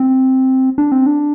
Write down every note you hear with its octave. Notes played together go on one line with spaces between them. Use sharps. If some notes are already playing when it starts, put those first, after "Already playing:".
Already playing: C4
D4
C4
D4